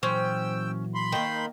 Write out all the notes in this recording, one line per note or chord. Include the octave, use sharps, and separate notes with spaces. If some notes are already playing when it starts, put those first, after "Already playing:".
A#2 E3 F#3 C#4 C5 G5 E6
B5 C6
D#3 A#3 G5